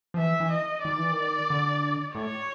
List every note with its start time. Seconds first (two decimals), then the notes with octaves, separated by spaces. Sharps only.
0.14 F3
0.18 E3 E5
0.40 E3
0.51 D#5
0.84 D#3 D5
0.98 E3
1.12 D#3
1.50 D3
2.15 A2 C#5